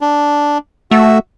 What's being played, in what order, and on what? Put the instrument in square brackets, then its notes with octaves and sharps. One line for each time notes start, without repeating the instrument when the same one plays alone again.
[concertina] D4
[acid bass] A3 [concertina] F#4 E5